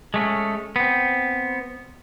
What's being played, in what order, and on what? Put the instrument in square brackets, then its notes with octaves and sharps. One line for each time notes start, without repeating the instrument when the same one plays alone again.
[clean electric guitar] G#3 A3 C#4
B3 C4